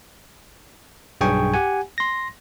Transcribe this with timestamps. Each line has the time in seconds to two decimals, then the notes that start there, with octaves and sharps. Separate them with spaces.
1.21 B1 G2 G#4 G5 G#5 C#6
1.54 G4 F#5 G#5
1.98 C6 A#6